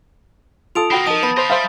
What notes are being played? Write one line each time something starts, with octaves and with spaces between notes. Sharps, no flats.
F4 A4 D#6 D7 F7
A#3 C4 F#4 G5 B5
F3 D#4 A#4 A5 D#6
B3 A5 B5 A6
C5 D#5 F5
G3 C5 E5 F5